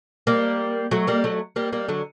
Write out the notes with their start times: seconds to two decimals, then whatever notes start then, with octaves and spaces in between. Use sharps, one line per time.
0.27 G3 A#3
0.91 F#3 A3
1.07 G3 A#3
1.24 F#3 A3
1.56 G3 A#3
1.72 G3 A#3
1.89 D3 F#3